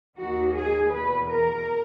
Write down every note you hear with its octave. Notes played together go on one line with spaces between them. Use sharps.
D#2 D#3 F#4
G#4
E2 B2 B4
A#4